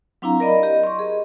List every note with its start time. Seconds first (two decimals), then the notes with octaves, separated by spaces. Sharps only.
0.22 F#3 C4 D4 E4 F5 A#5
0.40 A#4 D5 D#5 B5
0.63 G4 D#5
0.84 C6 C#6
0.99 G#4 D#5